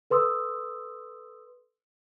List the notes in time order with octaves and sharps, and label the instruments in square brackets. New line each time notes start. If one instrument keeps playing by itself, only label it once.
[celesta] A4 B4 C6 D#6 E6